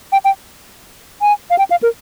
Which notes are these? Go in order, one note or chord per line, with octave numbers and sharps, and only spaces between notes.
G5
G5
G#5
F5
G5
F5
A#4